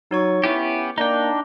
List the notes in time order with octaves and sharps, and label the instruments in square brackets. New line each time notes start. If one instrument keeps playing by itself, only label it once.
[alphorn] F#3 [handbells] D#4 C#5 C#6
[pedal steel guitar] B3 C#4 G4 [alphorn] E4 [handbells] D6
[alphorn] A#3 [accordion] D4 [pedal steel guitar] D#4 G5 [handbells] A#5